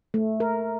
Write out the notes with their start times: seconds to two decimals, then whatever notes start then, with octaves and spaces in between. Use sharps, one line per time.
0.14 A3
0.40 A#4